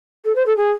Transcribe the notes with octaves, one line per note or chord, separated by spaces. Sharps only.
A4
C5
A4
G#4